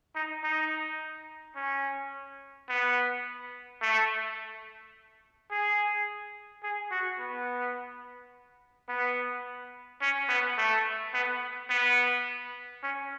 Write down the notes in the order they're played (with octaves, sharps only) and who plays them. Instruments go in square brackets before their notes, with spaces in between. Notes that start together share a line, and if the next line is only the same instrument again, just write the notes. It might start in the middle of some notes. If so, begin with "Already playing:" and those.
[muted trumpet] D#4
D#4
C#4
B3
A3
G#4
G#4
F#4
B3
B3
C#4
B3
A3
B3
B3
C#4